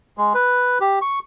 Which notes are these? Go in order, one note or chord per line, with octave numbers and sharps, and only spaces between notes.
G#3
B4
G4
C#6